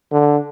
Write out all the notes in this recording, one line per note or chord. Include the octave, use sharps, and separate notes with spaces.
D3